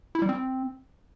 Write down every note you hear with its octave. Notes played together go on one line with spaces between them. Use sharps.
E4
G3
C4